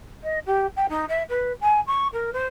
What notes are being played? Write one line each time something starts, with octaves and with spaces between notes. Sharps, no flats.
D#5
G4
G5
D#4
E5
B4
G#5
C#6
A#4
C5